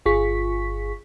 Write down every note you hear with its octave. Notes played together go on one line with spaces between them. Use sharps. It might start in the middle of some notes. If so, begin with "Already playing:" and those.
G1 F4 G#4 C#6 B6